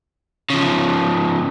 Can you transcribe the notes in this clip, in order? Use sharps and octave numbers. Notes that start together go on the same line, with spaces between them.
C#3 F3